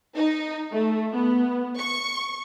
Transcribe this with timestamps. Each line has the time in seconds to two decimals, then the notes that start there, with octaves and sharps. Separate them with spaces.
0.16 D#4
0.73 A3
1.13 B3
1.79 C#6